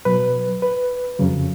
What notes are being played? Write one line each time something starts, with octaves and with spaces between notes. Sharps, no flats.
B2 F#3 B4
B4
F2 C#3 F#3